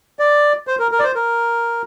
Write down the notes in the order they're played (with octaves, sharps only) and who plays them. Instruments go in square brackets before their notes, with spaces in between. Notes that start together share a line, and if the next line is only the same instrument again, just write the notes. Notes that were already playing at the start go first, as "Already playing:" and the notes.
[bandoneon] D5
C5
A#4
A#4
D5
C5
A#4